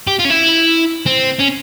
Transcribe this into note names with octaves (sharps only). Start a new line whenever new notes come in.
G4
F4
C#4
E4
C4
C#4